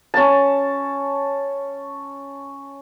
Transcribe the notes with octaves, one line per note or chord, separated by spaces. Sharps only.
C#4 A5